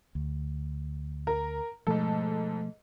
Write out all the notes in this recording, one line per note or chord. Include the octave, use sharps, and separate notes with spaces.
D2
A#4
G#2 B2 F3 A3 A4